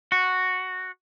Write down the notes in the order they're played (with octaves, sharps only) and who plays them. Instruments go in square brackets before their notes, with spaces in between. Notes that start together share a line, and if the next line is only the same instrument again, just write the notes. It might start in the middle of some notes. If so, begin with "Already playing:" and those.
[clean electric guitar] F#4